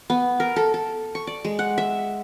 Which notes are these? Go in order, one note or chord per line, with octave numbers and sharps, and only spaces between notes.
B3
A#4
A4
A4
C#6
D5
G#3
F#5
E5